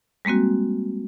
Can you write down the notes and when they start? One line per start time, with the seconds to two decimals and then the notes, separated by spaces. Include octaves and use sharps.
0.25 G3 G#3 A#3 C4 F#4